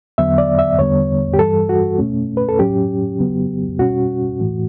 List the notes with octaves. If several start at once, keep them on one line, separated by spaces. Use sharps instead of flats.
E2 D3 F#3 B3 E5
D5
E5
E2 D3 G3 B3 C#5
G4
G2 E3 G3 A4
F#4
B2 A3 C#4
B4
A4
A2 F#3 C#4 G4
C#3 F#3 B3
B2 G3 C#4 F#4
A2 E3 A3